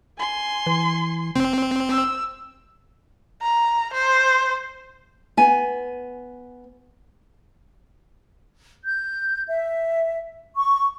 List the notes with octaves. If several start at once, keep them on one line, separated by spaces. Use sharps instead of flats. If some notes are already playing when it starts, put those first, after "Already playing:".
G#5 C6
E3
F1 C4
E6
A#5
C5
B3 G#5
G6
E5
C#6